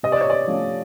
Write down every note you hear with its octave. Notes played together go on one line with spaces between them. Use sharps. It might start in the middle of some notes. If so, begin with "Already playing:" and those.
C3 D#5
D5
C#5
D5
F3 A3 C#4